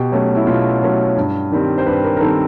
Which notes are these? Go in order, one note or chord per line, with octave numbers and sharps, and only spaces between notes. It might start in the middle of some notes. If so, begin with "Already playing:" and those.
Already playing: B2 G4
F#3 A3 C#4
E4
B2 F4
F#3 A3 C#4
G2
D#3 G3 C4
C5
G2 B4
A#4
A#4
D#3 G3 C4 A4